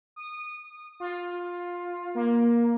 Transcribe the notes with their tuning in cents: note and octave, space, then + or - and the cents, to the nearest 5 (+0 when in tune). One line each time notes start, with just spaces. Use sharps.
D#6 -20
F4 +15
A#3 +15